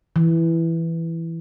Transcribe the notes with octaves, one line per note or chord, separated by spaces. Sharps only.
E3